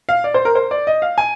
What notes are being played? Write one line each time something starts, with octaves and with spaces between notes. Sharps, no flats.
F5
D5
C5
A#4
C5
D5
D#5
F5
G#5